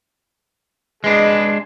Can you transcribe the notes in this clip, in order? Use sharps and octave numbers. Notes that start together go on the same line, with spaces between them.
G#3 D4 G#4 B4 D#5